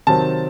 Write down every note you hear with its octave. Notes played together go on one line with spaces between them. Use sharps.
C3 D#3 F#3 C4 A5